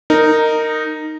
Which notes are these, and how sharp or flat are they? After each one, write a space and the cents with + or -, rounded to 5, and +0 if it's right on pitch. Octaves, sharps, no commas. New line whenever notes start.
D#4 -5 A#4 -15